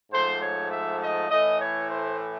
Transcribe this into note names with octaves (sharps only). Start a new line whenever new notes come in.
G#2 F3 A3 C5
C#5
E5
D#5
A2 E3 A3 D#5
C#5
C5